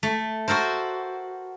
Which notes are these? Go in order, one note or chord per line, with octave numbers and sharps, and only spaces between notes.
A3
F#4 A4 A#4 C5